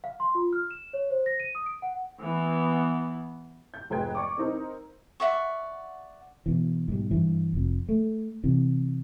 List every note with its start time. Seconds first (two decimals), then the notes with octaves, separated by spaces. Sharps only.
0.04 F5
0.20 C6
0.35 F4
0.53 F6
0.71 E7
0.93 C#5
1.10 C5
1.26 A#6
1.40 D#7
1.55 D#6
1.66 D7
1.82 F#5
2.19 E3 B3
3.74 G6
3.90 F1 G#2 G#3 B4 G5 G#6
4.15 D5 C#6 D6
4.38 C4 D#4 A#4
5.20 D5 E5 F#5 C#6
6.46 B2 E3
6.88 G#2 B2 G3
7.11 G2 E3
7.53 F1 F2
7.89 A3
8.44 C3 E3